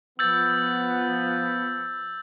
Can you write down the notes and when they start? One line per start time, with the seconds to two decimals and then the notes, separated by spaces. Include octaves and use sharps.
0.19 F3 B3 E6 G6 A6